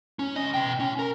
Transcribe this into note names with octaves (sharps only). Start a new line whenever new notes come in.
C#4
C#2 D#5
B2 G5
C#4
A#4